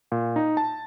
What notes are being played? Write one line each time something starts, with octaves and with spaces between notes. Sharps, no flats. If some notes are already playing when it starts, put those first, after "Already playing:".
A#2
D#4
A5